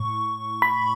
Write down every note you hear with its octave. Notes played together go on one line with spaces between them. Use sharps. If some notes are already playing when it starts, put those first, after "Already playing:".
Already playing: A2 C#6
B5